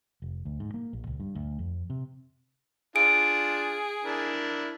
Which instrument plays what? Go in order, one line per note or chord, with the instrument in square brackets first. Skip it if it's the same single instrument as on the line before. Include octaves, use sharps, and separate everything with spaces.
[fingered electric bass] F1
D2
G#2
A#3
A#1
C#2
G2
D2
F2
C3
[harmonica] D4 F4 [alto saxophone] G#4 [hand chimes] D7
[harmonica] D4 E4 A#4